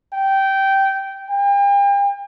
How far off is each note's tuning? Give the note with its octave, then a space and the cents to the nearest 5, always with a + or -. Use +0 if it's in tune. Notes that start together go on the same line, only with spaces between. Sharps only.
G5 -15
G5 +40